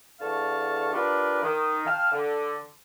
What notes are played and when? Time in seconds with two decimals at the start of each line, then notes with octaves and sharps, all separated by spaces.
0.20 E2 D3 F5 A5 C#6
0.93 D4 F4 G4 A#4 B4
1.43 D#3
1.86 F5 G5 A5 F6
2.12 D3